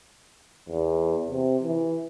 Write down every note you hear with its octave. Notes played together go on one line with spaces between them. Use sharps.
E2
C3
E3